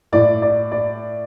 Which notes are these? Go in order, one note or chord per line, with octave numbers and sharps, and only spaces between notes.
A2 D5
D5
D5